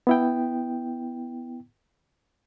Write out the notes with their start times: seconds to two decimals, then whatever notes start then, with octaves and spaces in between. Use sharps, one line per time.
0.07 B3 E4 G5